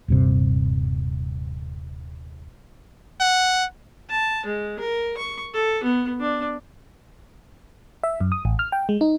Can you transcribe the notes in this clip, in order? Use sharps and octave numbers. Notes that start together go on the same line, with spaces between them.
D#1 G2 C3
F#5
A5
G#3
A#4
C#6
A4
B3
D4
E5
F#2
D#6
A1
F6
G5
G#3
D#4